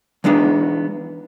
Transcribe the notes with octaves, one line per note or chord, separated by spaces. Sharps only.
E3 G#3 B3 D4 D#4